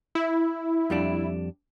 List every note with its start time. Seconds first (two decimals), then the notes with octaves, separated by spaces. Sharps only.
0.15 E4
0.90 F2 G3 D4